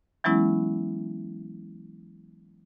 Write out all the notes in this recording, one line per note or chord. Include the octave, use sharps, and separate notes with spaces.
E3 F#3 G#3 B3 C#4 E4